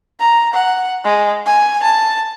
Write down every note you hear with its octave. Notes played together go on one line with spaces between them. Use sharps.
A#5
F#5
G#3
G#5
A5